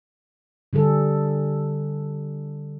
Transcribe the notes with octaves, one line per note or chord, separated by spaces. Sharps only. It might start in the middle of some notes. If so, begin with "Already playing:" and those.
D3 G3 G#4 A4